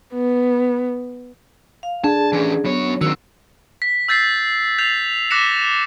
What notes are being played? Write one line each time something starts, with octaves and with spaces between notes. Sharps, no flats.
B3
F5
D4 G#4 A5
E3 C#4
F#2 F#3 B3 C#5
D#3 F#3 C4 E6
B6
E6 G6 A6 B6 C7
G6 A6 C7 F7 F#7
D6 F#6 A#6 B6 C#7 E7